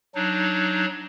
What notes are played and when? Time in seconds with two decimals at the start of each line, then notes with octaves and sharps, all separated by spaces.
0.15 F#3 D4 D#4